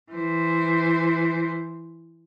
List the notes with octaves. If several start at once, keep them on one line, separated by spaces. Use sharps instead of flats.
E3 C5